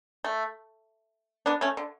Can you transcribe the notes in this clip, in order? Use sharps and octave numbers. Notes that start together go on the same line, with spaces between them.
A3
B3 D4
A3 C#4
D3